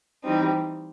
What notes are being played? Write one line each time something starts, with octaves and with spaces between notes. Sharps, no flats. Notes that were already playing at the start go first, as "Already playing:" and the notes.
E3 G3 C4 D#4